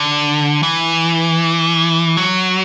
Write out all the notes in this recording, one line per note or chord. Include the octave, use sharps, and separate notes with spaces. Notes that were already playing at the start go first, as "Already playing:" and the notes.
Already playing: D3
E3
F#3